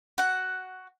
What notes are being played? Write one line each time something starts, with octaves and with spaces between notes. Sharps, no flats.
F#4 F#5